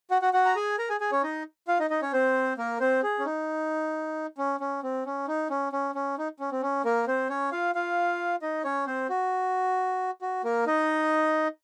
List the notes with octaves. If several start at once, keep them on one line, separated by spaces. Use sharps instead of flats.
F#4 F#5
F#4 F#5
F#4 F#5
A#5
G#4 G#5
A#4 A#5
G#4 G#5
G#4 G#5
C#4 C#5
D#4 D#5
F4 F5
D#4 D#5
D#4 D#5
C#4 C#5
C4 C5
A#3 A#4
C4 C5
G#4
C#4
D#4
C#4
C#4
C4
C#4
D#4
C#4
C#4
C#4
D#4
C#4
C4
C#4
A#3 A#4
C4 C5
C#4 C#5
F4 F5
F4 F5
D#4 D#5
C#4 C#5
C4 C5
F#4
F#4
A#3 A#4
D#4 D#5